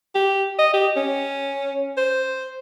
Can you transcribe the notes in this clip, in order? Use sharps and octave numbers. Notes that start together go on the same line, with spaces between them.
G4
D#5
G4
C#4
C5